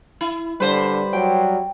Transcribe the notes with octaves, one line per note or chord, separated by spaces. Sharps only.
E4
D3 G3 B4 C5
F#3 G3 G5